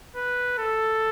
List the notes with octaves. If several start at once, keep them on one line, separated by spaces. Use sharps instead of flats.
B4
A4